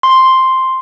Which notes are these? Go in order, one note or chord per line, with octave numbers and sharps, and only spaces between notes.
C6